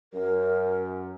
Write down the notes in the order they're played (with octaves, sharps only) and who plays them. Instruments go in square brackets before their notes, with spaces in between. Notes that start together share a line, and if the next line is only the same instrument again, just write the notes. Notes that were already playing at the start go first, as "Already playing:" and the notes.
[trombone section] F#2 [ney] A#4